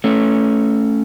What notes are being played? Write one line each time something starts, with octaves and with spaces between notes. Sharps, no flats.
A3 C#4